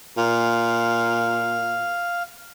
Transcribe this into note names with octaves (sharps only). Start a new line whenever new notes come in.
A#2 F5